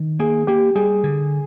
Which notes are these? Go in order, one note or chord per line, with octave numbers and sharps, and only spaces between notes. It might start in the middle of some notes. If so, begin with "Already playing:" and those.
Already playing: D#3
A#3 G#4
A#3 G4
G3 G#4
D3